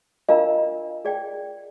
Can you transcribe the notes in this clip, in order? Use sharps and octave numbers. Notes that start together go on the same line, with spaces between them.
D4 F4 A#4 D#5 F5 A#5
G#4 D5 G5